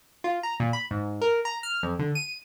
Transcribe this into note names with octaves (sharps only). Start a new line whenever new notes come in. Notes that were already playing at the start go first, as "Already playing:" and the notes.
F4
A#5
A#2
B5
G#2
A#4
A#5
F6
F2
D3
D#7